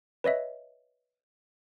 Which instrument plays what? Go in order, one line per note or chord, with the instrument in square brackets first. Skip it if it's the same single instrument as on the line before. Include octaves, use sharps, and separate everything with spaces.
[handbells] B4 C#5 D#5 E5